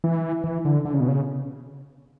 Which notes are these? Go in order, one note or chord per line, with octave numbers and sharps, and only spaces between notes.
E3
E3
D3
D3
C#3
B2
C#3